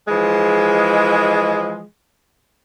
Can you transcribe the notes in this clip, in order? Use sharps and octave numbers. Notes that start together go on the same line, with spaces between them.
E3 F3 G#3